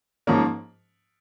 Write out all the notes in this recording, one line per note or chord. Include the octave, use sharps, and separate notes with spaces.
G#2 F3 A#3 C#4